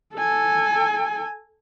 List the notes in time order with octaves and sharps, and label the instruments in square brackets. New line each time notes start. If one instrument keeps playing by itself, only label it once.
[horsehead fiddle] A4 G#5